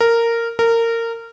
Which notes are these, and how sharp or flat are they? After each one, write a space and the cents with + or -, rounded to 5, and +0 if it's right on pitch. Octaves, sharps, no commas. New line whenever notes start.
A#4 -10
A#4 -20